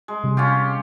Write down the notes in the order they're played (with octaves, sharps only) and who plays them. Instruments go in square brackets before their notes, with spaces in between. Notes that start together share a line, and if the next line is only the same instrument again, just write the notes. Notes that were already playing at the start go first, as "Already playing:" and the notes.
[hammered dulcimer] G#3
[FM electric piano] C3 G3
[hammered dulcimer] C#4 F4 G4